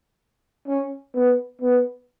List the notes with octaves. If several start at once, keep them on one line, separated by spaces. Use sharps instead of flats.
C#4
B3
B3